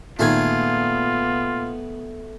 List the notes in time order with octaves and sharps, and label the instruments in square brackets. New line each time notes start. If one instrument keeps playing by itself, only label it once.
[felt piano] A#2 D#3 G#6 [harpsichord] A3 G#4 [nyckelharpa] B3 [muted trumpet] F4